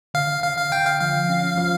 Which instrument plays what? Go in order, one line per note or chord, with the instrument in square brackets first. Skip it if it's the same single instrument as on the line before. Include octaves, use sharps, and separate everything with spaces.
[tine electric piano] D3 [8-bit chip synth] F5
[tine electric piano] D3 [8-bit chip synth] F5
[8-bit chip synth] F5
[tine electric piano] D3 [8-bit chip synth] G5
[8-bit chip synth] F5
[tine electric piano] F3 [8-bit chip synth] F5
[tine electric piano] C#4
F3